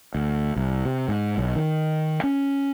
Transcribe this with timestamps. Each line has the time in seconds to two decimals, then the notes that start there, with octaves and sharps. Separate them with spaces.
0.15 D2
0.56 C2
0.85 C3
1.08 G#2
1.38 B1
1.56 D#3
2.23 C#4